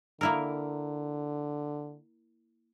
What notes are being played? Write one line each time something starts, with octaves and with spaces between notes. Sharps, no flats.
D3 A#3 E4 A#4